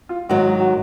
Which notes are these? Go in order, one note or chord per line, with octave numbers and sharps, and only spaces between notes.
F4
G#2 D#3 F#3 F#4
F#4